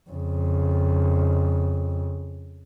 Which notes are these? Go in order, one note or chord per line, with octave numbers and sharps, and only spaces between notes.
F2 C#3